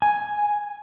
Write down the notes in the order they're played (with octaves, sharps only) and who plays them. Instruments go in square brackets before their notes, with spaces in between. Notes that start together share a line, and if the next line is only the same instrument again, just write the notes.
[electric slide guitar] G#5